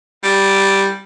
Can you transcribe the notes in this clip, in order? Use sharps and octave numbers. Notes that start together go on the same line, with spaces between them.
G3